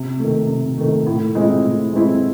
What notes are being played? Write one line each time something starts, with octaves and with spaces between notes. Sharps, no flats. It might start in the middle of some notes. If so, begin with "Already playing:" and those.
Already playing: C3
D#3 A3
C3
D#3 A3
A2
G#3 C4 E4
A2
G#3 C4 E4